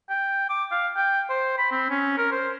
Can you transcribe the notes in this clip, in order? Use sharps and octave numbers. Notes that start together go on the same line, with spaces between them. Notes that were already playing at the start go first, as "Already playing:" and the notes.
G5
D6
F5
G5
C5
B5
C4
C#4
A#4
C5